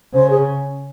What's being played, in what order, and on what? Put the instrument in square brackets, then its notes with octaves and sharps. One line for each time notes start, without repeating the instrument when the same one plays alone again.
[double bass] C#3 [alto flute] C5
[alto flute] G#4